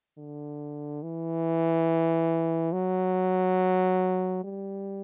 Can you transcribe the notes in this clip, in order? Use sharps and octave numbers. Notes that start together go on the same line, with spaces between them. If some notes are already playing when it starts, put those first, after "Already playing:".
D3
E3
F#3
G3